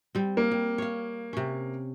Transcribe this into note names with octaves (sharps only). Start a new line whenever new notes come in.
G3 C4
A#3
G3
C#5 F5
C3 C#4